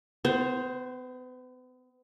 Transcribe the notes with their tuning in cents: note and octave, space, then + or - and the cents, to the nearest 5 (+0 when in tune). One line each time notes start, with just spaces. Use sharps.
B3 +40 C5 +0